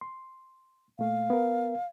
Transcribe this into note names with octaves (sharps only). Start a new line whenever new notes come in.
C6
A#2 A3 F5
B3 A#4